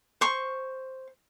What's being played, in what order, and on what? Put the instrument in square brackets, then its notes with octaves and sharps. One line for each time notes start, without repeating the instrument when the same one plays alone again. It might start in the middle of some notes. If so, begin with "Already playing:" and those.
[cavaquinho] C5 C#6